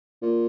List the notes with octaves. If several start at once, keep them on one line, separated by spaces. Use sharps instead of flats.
A#2